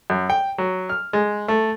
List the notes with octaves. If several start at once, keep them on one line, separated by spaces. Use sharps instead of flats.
F#2
G5
F#3
F6
G#3
A3